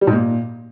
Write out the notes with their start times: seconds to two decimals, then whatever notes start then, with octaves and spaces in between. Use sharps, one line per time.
0.01 G3
0.07 G#2
0.13 A#2